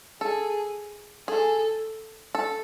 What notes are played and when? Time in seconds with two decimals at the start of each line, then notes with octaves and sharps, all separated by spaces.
0.21 G#4 A4
1.28 G#4 A4
2.35 A4